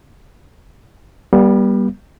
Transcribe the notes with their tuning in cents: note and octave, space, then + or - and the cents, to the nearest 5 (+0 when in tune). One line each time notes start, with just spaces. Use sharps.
G3 +0 B3 -40